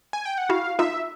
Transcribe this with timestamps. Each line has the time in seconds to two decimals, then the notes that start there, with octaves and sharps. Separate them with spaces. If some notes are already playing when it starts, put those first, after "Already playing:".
0.13 G#5
0.25 G5
0.38 F#5
0.49 E4 F#4 F5
0.79 D#4 F4 E5